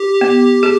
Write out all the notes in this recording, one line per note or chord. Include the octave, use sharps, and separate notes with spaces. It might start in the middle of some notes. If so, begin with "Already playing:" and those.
Already playing: G4
B3
G#4